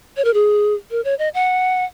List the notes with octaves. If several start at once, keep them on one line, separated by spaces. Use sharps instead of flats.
C#5
A#4
G#4
A#4
C#5
D#5
F#5